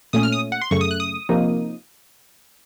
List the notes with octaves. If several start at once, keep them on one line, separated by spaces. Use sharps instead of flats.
A#2 A3 C#4 D#6
F6
D#6
F#5
C6
F#2 C#3 A3 C#6
D#6
F#6
D#6
C3 F3 A#3 D#4